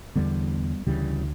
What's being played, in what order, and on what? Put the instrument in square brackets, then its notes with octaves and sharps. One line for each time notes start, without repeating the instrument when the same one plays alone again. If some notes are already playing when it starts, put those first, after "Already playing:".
[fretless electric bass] E2 D3 G3 B3
D2 C#3 E3 G3